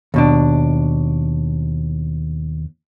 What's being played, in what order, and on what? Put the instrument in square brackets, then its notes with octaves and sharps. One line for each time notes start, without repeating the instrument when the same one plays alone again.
[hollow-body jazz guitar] D#2 B2 D4